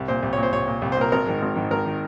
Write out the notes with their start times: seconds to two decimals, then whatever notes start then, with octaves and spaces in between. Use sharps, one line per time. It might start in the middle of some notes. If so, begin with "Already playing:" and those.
Already playing: C2
0.08 A#2 C5
0.23 C2
0.33 A#2 C#5
0.43 C5
0.52 C2 C#5
0.68 A#2
0.82 C2
0.92 C5
0.97 A#2 A#4
1.12 G#1 A#4
1.26 G#2 D#3
1.42 G#1
1.56 G#2 D#3
1.71 G#1 A#4
1.86 D#3